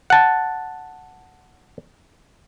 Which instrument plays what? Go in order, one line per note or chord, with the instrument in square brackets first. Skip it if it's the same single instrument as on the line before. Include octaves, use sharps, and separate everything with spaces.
[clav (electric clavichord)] F#5 A5